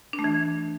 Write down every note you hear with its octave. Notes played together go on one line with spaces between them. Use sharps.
D4
A3
E3